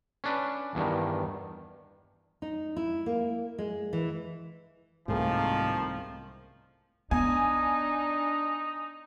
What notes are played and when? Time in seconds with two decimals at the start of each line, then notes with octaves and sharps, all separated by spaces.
0.24 C#4 D4 B4
0.75 E2 G2 D#3
2.42 D#4
2.76 E4
3.06 A#3
3.58 G#3
3.93 E3
5.08 C2 G#2 C3 D#3 F3 A3 A#3 G#4
7.11 B3 D4 D#4 G#5